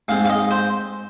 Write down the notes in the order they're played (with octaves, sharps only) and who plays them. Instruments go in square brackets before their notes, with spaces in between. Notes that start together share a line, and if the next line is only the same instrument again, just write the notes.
[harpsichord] G#2 G#3 C4 [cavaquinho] F5
[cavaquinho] F5
D#5
C5